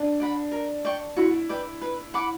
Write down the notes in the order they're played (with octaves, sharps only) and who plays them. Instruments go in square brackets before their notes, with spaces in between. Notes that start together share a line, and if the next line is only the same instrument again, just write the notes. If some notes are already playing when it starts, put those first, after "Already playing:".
Already playing: [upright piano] D4
[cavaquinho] D5 F#5 B5
A#4
D5 G5 C#6
[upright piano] E4 [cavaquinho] F#4
[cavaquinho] B4 D5 G5
B4
F#5 B5 D6